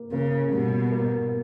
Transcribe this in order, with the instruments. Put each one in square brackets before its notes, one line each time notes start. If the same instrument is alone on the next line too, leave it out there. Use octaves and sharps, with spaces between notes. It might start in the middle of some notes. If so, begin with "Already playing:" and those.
Already playing: [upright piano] A#3
[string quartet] C#3 [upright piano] A#3
[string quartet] B2 [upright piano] G3
[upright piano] A#3